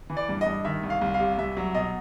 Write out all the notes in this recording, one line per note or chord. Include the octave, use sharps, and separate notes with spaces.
E3
D5
G2
D#5
G2
D#3 E5
C2
F5
C2
F5
C3
C2 E5
F#3
B2 D#5